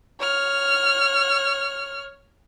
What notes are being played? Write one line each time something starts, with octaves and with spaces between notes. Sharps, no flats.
C#5 F6